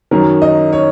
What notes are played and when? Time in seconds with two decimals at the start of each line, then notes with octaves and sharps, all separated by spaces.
0.11 F#2 D#3 F#3 C#4 A#4
0.42 D#5
0.73 C#5